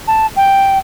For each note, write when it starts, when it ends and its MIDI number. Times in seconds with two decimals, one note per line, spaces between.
0.07 0.26 81
0.36 0.78 79